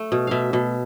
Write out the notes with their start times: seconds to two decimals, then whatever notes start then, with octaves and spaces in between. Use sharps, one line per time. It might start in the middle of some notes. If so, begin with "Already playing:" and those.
Already playing: A3
0.12 B2
0.27 B2 E5 F5
0.53 B2